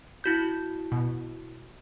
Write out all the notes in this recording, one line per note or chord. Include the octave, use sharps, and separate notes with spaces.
E4 F#4 G6
B2